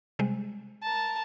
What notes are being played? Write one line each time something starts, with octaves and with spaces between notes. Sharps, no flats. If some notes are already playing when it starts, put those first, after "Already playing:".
C3 G3 G#3
A#4 A5